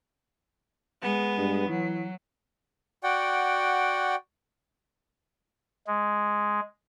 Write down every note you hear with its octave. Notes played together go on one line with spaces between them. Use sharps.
G#3 B3
G2
E3 F#3
F#4 D5 F#5 G5
G#3